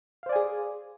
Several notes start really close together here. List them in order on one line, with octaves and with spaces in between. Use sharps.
F5 C5 D5 G#5 G#4